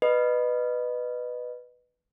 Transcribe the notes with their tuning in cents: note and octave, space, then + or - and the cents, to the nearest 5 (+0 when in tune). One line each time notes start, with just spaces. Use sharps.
B4 +0 D#5 -25